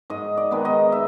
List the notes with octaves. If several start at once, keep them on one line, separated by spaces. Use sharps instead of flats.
G#2 D#5
D5
D#3 G#3 B3
D#5
E5